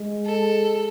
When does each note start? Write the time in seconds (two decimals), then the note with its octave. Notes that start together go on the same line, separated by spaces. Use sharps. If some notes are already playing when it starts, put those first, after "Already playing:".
Already playing: G#3
0.26 A4